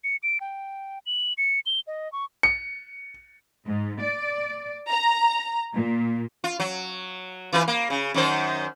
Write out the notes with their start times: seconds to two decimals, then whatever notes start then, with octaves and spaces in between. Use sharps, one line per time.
0.04 C#7
0.23 D7
0.40 G5
1.06 F#7
1.38 C#7
1.66 G7
1.87 D#5
2.12 C#6
2.43 C#7
3.66 G#2
4.01 D5
4.90 A#5
5.74 A#2
6.44 F4
6.60 F#3
7.53 E3 F4 B4
7.68 A#3
7.90 C#3
8.14 F#2 D#3 C5